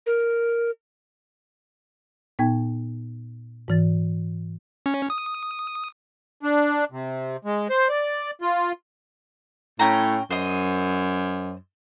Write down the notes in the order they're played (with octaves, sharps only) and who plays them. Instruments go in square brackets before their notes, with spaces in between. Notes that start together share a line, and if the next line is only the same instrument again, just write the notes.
[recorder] A#4
[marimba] A#2 B3 D#4 G5 G#6
G#2 E3 A6
[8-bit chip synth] C#4
D#6
[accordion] D4
C3
G#3
C5
D5
F4
[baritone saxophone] A2 [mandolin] C#4 G5 A#5
[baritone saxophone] F#2 [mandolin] C5 D#5